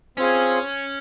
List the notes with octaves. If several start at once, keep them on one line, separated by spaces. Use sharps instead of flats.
C4 C#4 F4 G#4